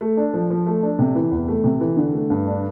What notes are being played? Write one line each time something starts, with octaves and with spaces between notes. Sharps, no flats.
A3
D4
F3
F3
A3
D4
C3
E3
E2
A3
C3
E3
D3
A3
G2
D4